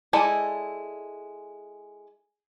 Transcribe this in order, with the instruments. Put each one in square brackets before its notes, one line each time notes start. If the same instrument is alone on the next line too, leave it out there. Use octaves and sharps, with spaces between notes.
[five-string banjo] G#3 E4 A4 D5 D#5